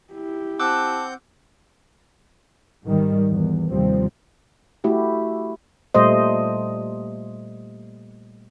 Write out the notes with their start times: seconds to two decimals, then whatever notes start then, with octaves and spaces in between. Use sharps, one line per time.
0.13 E4 G4
0.60 C4 F#5 A5 D6 E6 F#6 G6
2.84 G#2 D#3 G3
3.29 E2
3.70 D#2 C3 F3 G3 C4
4.84 A3 E4 F#4 G4
5.94 A#2 G3 A3 C5 D#5